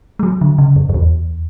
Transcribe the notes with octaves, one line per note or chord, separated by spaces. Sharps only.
G#3
F#3
D3
C#3
F#2
F#2
E2